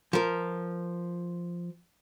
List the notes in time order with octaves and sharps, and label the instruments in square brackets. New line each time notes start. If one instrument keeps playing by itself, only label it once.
[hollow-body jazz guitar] F3 A#4